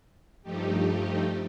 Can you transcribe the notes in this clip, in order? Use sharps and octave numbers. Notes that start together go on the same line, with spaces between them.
G2 F3 A3 D#4 G4